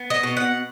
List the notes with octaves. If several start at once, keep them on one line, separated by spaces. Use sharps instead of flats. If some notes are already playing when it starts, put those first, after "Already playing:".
Already playing: B3
D#5
B2
F#5